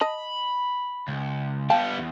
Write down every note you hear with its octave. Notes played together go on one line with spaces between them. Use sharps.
D#5 A5 B5
C#2
G3 B3 F5 G5 A5
E2